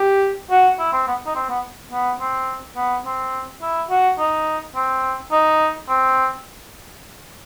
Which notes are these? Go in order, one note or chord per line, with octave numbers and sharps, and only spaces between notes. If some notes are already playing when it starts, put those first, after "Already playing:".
Already playing: G4
F#4
E4
C4
B3
D#4
C4
B3
B3
C4
B3
C4
E4
F#4
D#4
C4
D#4
C4